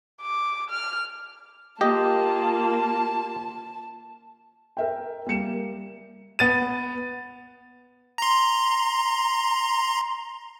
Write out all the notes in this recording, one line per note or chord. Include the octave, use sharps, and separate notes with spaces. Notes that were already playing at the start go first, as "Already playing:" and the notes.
D6
F6
A#3 F4 G4 D#5 A5
A#4 E5 G5
G3 A#3 C#7 E7
B3 A6 D#7
A#5 C6